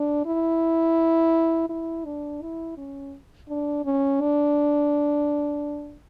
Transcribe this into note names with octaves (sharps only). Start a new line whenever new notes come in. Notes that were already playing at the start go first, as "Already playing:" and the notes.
Already playing: D4
E4
E4
D4
E4
C#4
D4
C#4
D4